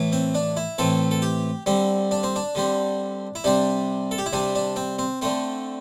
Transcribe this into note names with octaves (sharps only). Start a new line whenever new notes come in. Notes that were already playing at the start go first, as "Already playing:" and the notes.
Already playing: A2 E3
C4
D4
E4
A2 E3 C4 A4
A4
G4
D3 G3 C4
D4
C4
D4
D3 G3 C4
E4
C3 G3 C4 D4
A4
G4
E4
C3 G3 C4 D4
D4
C4
C4
D3 A3 C4